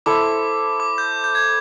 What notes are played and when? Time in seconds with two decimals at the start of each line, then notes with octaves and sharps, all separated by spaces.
0.06 E4 A4 C5 E5 D6
0.80 D6
0.98 G6
1.24 G6
1.35 G#6